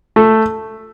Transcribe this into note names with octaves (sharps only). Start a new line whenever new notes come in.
A3